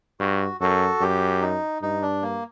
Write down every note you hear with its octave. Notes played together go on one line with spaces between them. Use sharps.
G2 F#4
F#2 F#4 A4
F#2 G4
D#4
G2 D#4
D4
A#3